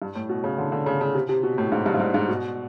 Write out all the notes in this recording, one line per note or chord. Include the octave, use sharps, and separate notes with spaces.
G2
A2
B2
C#3
D3
D3
C#3
C#3
C3
C3
B2
A2
G#2
G2
G#2
G2
G#2
B2